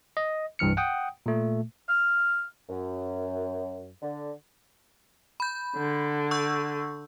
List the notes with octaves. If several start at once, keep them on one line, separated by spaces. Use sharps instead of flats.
D#5
C2 G2 E3 F6 C#7
F#5 G5 D#6
A#2 A3
F6
F#2
D3
B5 G6
D3
C#6 E6 G6